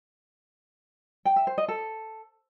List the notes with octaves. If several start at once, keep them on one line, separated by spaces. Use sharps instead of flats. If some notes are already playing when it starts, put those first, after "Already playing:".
G5
E5
C5
D#5
A4